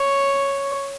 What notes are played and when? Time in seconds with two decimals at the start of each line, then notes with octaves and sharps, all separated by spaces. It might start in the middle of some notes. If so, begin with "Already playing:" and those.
Already playing: C#5